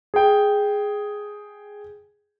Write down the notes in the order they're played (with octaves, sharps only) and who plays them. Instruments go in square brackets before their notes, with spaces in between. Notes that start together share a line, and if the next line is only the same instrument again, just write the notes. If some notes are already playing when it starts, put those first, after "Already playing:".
[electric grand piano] G#4 G5